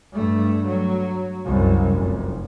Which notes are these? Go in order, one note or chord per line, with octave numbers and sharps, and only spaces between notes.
G2 A3
F#3
C2 F#2
F1